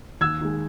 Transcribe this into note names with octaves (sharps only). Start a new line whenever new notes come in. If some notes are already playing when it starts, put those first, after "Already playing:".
D#2 E6 G#6
D#3 G#3